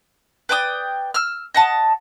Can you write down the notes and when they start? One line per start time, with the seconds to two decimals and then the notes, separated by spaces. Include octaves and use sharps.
0.49 B4 D5 G5 D#6
1.14 E6 F6
1.54 D#5 F#5 A5